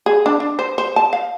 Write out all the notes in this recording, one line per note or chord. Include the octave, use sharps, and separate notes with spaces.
G#4
D4
D4
C5
C5
A5
F5